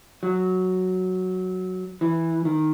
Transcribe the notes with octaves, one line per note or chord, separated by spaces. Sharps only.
F#3
E3
D#3